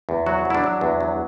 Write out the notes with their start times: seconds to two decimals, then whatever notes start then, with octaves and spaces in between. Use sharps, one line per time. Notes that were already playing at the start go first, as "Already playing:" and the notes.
0.09 E2
0.26 F#3 F#4
0.45 F#3
0.50 E4
0.55 D4
0.64 F#3
0.81 E2
1.01 F#3